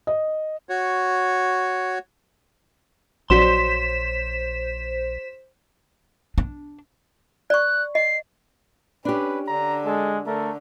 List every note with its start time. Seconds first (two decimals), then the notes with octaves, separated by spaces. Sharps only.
0.07 D#5
0.69 F#4 C#5
3.30 A#1 F#3 F#4 C5 D5 C6 B6 E7
6.38 D4
7.50 D5 C#6 F#6
7.95 D#5 C7
9.05 C#4 D4 G4 B4
9.47 D3 A#5
9.86 G#3 A4
10.27 D3 A3 A#4